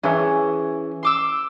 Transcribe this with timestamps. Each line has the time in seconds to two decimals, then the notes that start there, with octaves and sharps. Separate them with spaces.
0.03 E3 C#4 G#4
1.03 C6 D6 E6